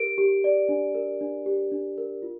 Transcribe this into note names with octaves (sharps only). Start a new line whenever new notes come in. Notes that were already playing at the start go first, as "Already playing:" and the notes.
Already playing: G4 A#4 D7
G4
D5
D4
A#4
D4
G4
D4
A#4
F4